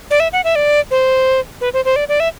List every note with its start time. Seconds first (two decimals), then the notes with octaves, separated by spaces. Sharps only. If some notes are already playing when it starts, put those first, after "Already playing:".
0.11 D5
0.20 E5
0.33 F#5
0.44 E5
0.55 D5
0.91 C5
1.61 B4
1.73 C5
1.85 C5
1.96 D5
2.09 D5
2.20 E5